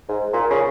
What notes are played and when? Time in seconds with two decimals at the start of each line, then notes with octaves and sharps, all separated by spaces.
0.09 G#2
0.33 A#2
0.50 C#3